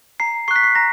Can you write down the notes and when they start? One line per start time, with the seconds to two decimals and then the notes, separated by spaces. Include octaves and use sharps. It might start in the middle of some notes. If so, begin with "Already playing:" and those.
0.20 A#5 C7
0.48 C#6 F#6 C7
0.56 B6
0.64 C7
0.75 A#5 A#6